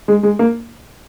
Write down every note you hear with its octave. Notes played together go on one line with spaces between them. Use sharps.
G#3
G#3
A#3